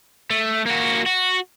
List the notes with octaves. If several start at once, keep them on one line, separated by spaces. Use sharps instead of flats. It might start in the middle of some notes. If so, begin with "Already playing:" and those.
A3
A#3 F#4
F#4